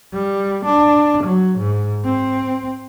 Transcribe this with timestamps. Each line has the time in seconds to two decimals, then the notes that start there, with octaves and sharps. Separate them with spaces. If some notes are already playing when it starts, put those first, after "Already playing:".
0.13 G3
0.65 D4
1.23 F#3
1.59 G#2
2.05 C4